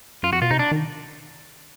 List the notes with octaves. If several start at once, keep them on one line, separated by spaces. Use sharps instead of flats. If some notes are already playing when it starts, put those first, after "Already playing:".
F#2 F4
F2 F#4
B2 F4
C3 D#4
D4
D#3